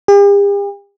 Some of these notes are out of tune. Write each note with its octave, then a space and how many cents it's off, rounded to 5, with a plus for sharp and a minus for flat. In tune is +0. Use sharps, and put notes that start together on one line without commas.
G4 +45